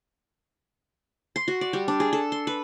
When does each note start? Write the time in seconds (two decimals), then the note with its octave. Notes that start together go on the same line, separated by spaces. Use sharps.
1.36 C6
1.48 F#4
1.61 D5
1.73 G3
1.88 D4
2.00 G#4
2.13 A4
2.32 C6
2.47 B4